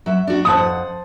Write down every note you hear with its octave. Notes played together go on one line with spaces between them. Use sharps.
F#3 E5
D4 F#4
F2 C5 F#5 A5 D#6